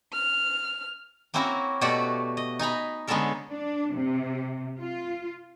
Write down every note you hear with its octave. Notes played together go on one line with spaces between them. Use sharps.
F6
A#3 C4 C#4 E4 F#4 A#4
B2 A3 F#4 G4 D5 F#5
D#5
D#4 G#5 A#5 B5
D3 G#3 B3 C#4 A4 A#4
D4
C3
F4